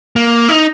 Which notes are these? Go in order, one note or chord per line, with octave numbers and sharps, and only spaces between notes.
A#3
D#4